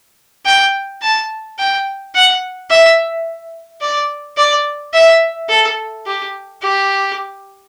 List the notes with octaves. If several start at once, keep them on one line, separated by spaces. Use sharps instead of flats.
G5
A5
G5
F#5
E5
D5
D5
E5
A4
G4
G4